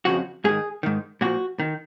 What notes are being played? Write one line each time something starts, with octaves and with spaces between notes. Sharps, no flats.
F2 C#3 F3 F#4
G#2 D#3 G#4
G#2 D#3
A#2 F3 F#4
D#3